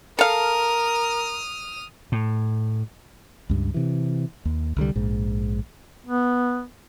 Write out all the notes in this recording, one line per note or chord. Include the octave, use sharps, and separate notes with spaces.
A4 A#4 F5 D#6 F6
A2
C#2 G2
C3 E3
D#2
C2 D3 G3
A#1 G#2
B3